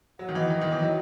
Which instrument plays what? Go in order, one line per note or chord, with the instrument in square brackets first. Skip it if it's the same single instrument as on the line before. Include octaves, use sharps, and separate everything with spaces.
[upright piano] F#3 [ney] F#5
[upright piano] D#3
[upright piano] E3 [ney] D#5
[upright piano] E3
D#3
E3
F#3